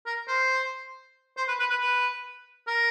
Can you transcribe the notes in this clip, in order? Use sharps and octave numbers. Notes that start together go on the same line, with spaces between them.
A#4
C5
C5
B4
B4
B4
B4
A#4